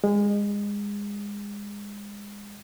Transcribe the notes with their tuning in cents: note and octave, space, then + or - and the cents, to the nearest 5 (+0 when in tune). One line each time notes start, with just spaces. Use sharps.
G#3 -25